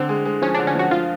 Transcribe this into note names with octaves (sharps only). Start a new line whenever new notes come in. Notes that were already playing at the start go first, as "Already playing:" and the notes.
Already playing: D3 C4
G#3
G#3
F3 C#4
D4
D3
C#4
F3 F#4
F3 F4